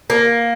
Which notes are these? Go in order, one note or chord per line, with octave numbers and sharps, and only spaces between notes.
A#3